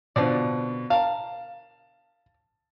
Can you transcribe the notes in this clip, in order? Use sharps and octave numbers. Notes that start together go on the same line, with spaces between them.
B2 D3 F3 C4 D5
A#4 F5 A5